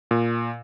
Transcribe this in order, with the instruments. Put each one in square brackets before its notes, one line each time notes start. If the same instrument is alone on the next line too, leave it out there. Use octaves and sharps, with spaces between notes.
[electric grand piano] A#2